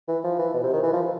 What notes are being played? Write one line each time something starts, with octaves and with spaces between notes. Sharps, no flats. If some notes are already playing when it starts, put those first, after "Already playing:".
E3
F3
E3
B2
C3
D#3
E3
F3